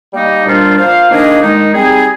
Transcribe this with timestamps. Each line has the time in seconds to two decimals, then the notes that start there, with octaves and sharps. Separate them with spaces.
0.13 G3 A#3 D#4
0.46 A#2 G3 D4 F4 C5
0.78 A#3 F4 C5 F5
1.10 D#3 A#3 D4 G#4 D#5
1.42 D#3 G#3 D#4
1.73 G3 C4 D#4 G#4